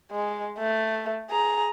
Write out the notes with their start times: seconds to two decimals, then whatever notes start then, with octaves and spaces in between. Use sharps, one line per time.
0.12 G#3
0.59 A3
1.30 G#4 A#5